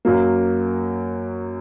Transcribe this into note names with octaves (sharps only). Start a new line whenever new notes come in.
F#2 F#3 A#3